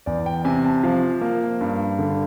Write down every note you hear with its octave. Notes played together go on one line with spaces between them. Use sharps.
E2 D5
G5
C3 G#5
A5
F3 F5
A#3
G2
D3